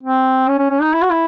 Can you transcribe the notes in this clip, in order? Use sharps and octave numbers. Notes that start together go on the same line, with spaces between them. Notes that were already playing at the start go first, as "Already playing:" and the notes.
C4
C#4
C#4
C#4
D#4
E4
F#4
E4